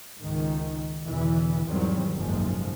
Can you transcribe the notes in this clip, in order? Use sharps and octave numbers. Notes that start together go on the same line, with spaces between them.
C#2 G#2 D#3
E2 B2 D3 E3
E2 G#2 D#3 F#3 G3 C4
F#1 B1 G#2 F3 G#3